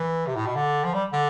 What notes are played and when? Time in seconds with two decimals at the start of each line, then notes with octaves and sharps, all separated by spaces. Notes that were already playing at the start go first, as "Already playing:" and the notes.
Already playing: E3
0.27 C3
0.36 A2
0.47 B2
0.56 D3
0.84 F3
0.94 G3
1.13 D3